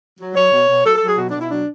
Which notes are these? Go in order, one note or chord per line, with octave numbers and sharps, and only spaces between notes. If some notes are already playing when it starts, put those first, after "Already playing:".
F#3
F#3 C#5
B2
B2
F#3 A4
A4
F#3
G#4
B2 F#4
B2 D4
E4
F#3 D4